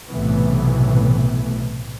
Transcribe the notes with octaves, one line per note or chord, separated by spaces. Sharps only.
B1 A2 C3 E3 A3 B3